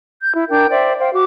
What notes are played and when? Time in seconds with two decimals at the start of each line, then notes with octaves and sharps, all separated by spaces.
0.21 G6
0.34 E4
0.49 D4 A#4 G5 G6
0.69 C5 D5 E5 G5
0.99 C5 F5 G5
1.12 F#4 D6